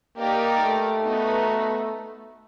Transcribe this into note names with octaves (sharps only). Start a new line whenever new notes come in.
A#3 D#4 G4 A#4 D5
A3
B3 D#4 F#4 B4